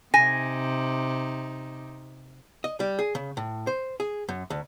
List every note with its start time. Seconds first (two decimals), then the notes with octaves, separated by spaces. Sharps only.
0.14 C3 D#4 G#5 A#6
2.64 D#5
2.80 G3
2.99 G#4
3.15 C#3
3.37 A2
3.67 C5
4.00 G#4
4.28 F#2
4.50 D2